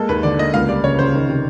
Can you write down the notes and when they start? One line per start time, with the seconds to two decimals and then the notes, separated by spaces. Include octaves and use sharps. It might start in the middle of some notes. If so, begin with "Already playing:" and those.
Already playing: G#3 A#3 A4
0.09 D#2 B4
0.23 D3 D5
0.39 A#3 D#5
0.53 C#2 F5
0.69 G3 D5
0.83 C#3 C#5
0.99 C#3 C5
1.14 D#3
1.29 C3